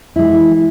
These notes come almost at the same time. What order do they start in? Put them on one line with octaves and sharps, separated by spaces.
E4 G#3 E3